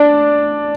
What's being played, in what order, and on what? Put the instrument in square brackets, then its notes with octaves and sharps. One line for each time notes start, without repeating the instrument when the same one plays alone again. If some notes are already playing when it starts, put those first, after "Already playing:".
Already playing: [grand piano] D4 D5